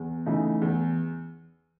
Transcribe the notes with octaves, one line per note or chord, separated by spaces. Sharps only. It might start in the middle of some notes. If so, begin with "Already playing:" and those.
Already playing: E2
C#3 E3 A3 D#4
E2